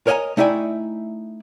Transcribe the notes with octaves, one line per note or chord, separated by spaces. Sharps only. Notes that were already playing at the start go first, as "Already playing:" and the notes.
A#4 C#5 D#5 F5 G#5 A#5
A3 D#4 E4 D5 G5 G#5